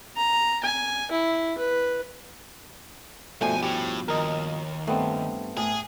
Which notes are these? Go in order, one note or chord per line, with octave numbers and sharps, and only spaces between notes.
A#5
G#5
E4
B4
B1 G2 B2 F3 A3 G#5
A2 G4
D#2 A#4 D#5
G2 A3 B3 C4
A2 G#4